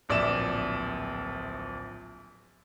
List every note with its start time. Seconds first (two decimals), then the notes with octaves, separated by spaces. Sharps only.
0.09 D1 A#1 D5 E5 E7